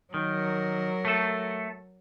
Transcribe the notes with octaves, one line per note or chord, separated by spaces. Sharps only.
D#3 F#3 A#4
A3 A4